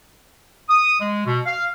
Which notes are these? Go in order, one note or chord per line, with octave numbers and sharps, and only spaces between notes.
D#6
G#3
B2
F5